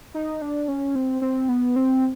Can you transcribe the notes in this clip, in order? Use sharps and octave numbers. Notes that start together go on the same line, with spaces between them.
D#4
D4
C#4
C4
C4
B3
C4